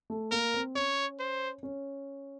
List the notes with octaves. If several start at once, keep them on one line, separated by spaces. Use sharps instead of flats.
A3
A#3 A#4
C4
C#4 C#5
C5
C#4